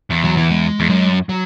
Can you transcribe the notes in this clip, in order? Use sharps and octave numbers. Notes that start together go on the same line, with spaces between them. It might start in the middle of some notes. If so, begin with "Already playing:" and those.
E2
F#3
E3
G#3
E2
F#2
F#3